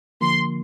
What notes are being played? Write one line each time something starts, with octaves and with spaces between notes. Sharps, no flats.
D3 F3 A#3 C6